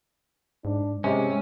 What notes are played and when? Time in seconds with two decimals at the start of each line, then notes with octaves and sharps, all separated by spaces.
0.65 G#2 D4
1.04 C3 G#3 C#4